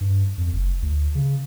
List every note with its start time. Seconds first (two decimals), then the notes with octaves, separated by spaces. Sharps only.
0.01 G2
0.38 F2
0.53 F#1
0.82 D2
1.15 C#3